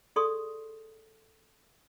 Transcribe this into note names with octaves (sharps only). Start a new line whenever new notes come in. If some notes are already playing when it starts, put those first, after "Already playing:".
G#4 A4 D5 C6 C#6 D#6